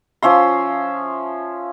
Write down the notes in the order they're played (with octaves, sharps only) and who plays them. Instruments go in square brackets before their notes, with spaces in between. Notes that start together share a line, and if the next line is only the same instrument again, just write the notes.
[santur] F3 C#4 E5 C6